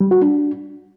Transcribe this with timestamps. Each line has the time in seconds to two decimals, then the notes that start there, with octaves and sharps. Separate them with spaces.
0.01 G3
0.11 F#4
0.22 D4